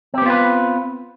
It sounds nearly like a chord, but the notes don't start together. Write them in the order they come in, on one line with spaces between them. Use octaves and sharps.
C4 G4 B3 F4 B4